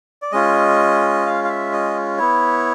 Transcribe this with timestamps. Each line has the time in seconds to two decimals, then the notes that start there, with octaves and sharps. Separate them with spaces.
0.22 D5
0.32 G#3 C#4 F4 D#5
1.26 F5
1.44 F5
1.49 E5
1.73 D#5
2.18 B3 E4 C#5